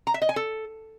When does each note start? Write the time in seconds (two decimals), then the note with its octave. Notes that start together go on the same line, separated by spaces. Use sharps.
0.07 A#5
0.14 E5
0.22 D#5
0.29 G#5
0.36 A4